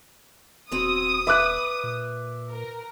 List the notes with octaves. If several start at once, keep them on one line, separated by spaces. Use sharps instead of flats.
D#1 F#3 C4 D#6
B4 E5 D6 F#6
A#2
A#4